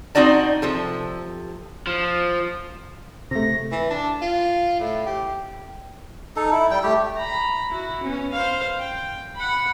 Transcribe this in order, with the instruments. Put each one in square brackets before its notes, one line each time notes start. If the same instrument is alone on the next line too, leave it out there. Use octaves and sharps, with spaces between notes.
[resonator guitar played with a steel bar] C4 C#4 D#4 F#4 D5 A5
C3 F3 A4
[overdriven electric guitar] F3
[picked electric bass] C3 A3 [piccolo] A#6
[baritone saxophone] E3
D4
F4
A2
G4
[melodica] D#4 A4
E4
G3 G5
A3 G4
[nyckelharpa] A#5 B5
E4 F#4
B3 C#4
C5 F5
G5
F#5 B5